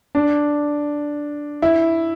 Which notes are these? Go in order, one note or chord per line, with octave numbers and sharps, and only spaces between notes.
D4
E4